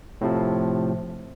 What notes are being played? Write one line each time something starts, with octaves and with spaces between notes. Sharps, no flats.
A2 C3 F3